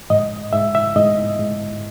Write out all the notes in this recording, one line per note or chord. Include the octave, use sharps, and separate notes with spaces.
G#2 D#5
G#2 E5
E5
G#2 D#5
G#2